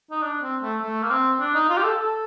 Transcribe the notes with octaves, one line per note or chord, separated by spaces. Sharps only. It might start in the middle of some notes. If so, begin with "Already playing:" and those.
D#4
D4
C4
A3
A3
A#3
C4
D4
D#4
F4
G4
A4
A4